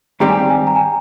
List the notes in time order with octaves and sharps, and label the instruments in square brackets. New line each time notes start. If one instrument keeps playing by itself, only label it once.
[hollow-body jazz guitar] G2 D#3 G3 C4 G4 [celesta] A#5
[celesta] G#5
G5
G#5
A#5
G#5